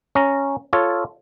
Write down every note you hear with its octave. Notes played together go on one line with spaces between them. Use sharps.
C#4 A#5
F4 A4 C#5